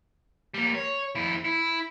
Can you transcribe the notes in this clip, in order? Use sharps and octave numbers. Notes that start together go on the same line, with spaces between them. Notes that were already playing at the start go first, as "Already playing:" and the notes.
G3 A#3
C#5
F2 E4
E4